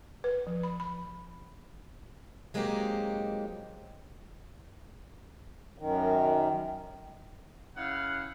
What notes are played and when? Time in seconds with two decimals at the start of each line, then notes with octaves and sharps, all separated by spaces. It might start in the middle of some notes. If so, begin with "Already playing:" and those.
0.24 B4
0.47 F3
0.63 B5
0.80 B5
2.54 F#3 G#3 A#3 C4 D#4 G4
5.78 F#2 D#3
7.77 C#3 E4 F5 F#5